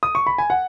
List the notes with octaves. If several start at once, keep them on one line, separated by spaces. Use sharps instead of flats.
D#6
C#6
B5
G#5
F#5